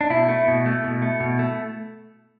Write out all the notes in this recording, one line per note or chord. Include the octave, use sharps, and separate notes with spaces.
D4
B2 E4
A3
B2
A3
B2
A3
B2
A3